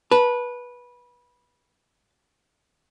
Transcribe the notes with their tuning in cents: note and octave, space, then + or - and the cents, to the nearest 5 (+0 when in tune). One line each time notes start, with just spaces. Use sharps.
B4 -15 A5 +0